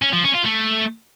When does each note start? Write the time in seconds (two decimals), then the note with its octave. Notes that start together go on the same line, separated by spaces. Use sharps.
0.02 C#4
0.13 F3
0.23 C#4
0.34 F4
0.44 A3